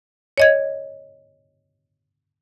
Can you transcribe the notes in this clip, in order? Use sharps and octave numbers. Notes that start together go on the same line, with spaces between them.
C#5 D#5 G#6